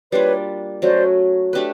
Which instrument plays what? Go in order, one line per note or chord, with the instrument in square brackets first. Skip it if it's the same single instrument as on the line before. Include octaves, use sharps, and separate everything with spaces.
[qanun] G3 A#3 D4 F4 [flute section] B4 C#5
[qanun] F#3 A3 C#4 F#4 [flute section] C5 D5
[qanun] A3 D4 G4 B4